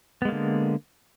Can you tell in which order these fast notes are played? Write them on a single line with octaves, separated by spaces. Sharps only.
B3 G#3 A#3 D3